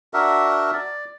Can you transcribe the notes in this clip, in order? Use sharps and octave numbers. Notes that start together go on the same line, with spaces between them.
D4 F#4 A#4 E5
D5